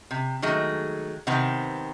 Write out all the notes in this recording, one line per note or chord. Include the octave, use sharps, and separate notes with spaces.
C3
D#3 F#3 G#3 A3
C3 D#3 B3 C4